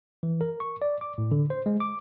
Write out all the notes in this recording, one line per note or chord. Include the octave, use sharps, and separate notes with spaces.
E3
A#4
C#6
D5
D6
A2
D3
C5
G#3
D6